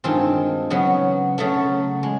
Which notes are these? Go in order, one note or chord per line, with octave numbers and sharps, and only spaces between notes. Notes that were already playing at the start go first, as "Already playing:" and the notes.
G2 D#3 G#3 C4 F4
C#3 F#3 B3
C#3 F#3 A3
G#3